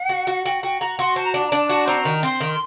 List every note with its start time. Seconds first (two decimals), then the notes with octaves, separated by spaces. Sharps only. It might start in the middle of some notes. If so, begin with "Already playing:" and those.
Already playing: F#5
0.09 F#4
0.27 F#4
0.45 F#4 G5
0.63 F#4 G5
0.80 F#4 A#5
0.99 F#4 C6
1.16 C5 A5
1.24 A#5
1.32 D4 A5
1.48 A#5
1.52 D4 A5
1.69 F#4
1.87 C4 A#5
2.05 D#3
2.23 C4 C6
2.41 D#3